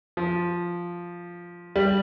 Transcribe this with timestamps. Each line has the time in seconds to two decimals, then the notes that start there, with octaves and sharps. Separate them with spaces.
0.17 F3
1.76 G3